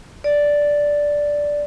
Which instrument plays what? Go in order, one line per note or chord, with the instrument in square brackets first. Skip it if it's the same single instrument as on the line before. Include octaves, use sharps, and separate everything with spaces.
[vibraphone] D5